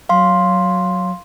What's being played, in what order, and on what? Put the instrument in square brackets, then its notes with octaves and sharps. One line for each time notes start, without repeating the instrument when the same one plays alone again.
[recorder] F#3 [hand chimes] F5 C6